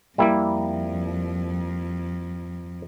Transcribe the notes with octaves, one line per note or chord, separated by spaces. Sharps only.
F2 G3 A#3 E4